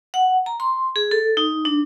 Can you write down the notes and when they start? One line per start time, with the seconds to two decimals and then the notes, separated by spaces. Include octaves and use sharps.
0.14 F#5
0.46 A#5
0.60 C6
0.96 G#4
1.11 A4
1.37 D#4
1.65 D4